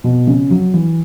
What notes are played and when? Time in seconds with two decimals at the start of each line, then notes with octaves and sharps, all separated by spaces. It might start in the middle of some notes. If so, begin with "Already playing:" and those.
0.04 B2
0.27 C#3
0.50 F#3
0.74 E3